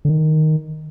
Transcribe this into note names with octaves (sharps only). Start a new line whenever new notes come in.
D3
D#3